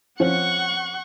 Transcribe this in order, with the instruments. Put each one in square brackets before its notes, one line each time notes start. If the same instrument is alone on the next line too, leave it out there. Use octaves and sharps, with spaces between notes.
[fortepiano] F3 C4 C#4 [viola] F#5 C#6